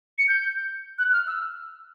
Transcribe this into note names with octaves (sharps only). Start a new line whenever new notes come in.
C#7
G6
F#6
F6
E6